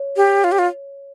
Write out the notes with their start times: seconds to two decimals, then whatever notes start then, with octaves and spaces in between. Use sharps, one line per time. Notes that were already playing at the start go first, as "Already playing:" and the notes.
Already playing: C#5
0.16 G4
0.44 F4
0.52 G4
0.59 F4